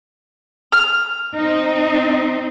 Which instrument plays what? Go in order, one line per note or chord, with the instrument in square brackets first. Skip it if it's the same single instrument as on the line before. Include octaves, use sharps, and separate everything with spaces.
[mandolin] F6
[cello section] C4 D#4